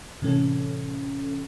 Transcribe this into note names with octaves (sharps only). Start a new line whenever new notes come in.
A2 C3 E3 C#4 A4